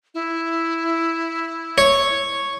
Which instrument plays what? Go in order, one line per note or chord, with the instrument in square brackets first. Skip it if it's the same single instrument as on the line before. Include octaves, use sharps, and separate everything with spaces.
[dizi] E4
[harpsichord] C#5